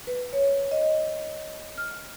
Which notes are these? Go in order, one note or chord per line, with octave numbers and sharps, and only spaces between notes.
B4
C#5
D#5
F6